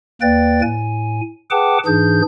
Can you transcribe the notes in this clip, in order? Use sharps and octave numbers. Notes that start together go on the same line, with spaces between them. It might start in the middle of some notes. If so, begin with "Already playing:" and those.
D#2 A#3 B4 D5 G5 A6
A2 G#5
G#4 B4 F#5 G5 A5 D6
G#2 E3 D4 G#4 G6